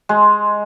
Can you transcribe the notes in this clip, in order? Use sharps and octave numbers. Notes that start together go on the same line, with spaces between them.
G#3